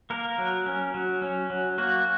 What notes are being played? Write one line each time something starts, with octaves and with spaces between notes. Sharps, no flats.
A#3 A#4
F#3
C#4
F#3
C#4
F#3
A#3 F#4